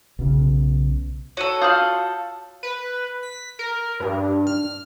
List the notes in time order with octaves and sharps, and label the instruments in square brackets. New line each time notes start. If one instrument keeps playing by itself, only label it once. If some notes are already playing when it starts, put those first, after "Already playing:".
[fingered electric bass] B1 C#3
[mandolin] F#4 A4 [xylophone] C#5 D#7
[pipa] F4 F5 [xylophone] D#6 G6 F#7
[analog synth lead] B4
B6
A#4
G2
F6